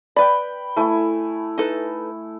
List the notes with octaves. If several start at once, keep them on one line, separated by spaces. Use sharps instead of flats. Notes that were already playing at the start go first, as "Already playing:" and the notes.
B4 D5 G5 B5
A3 E4 G#5
D#4 A4 B4